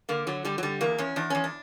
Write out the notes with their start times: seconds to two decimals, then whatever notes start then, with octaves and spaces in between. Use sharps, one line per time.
0.09 D3 A#3
0.27 D3 F#3
0.45 D3 G3
0.58 F#3
0.63 D3 G3
0.81 E2 A#3
0.98 E2 C#4
1.16 E2 D4
1.30 E2 C#4
1.44 D4